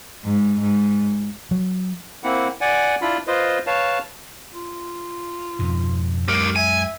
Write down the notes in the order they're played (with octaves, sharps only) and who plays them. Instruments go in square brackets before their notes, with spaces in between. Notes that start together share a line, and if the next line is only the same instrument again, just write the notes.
[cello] G#2
G#2
[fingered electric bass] F#3
[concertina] A#3 C4 E4 F#5
D5 F#5 G#5
D4 E4 F4 B5
F4 B4 C5 D#5
B4 C#5 F5 A5
[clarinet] F4
[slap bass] F2 G#2 B2
[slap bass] F#2 G#3 [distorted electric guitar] G4 A#4
[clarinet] E5 [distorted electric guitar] G#5